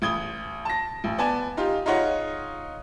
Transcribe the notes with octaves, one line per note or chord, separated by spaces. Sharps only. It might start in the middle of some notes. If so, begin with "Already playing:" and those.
A1 D#6 G#6 G7
A5 A#6
A1
B3 D5 G#5 A5
D#4 F4 G4
D#4 F4 G#4 C#5 D#5 F#5